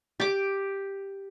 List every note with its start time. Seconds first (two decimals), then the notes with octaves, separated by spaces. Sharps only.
0.20 G4 D6